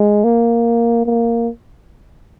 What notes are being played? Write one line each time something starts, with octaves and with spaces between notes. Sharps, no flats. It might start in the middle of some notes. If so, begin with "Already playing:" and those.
Already playing: G#3
A#3
A#3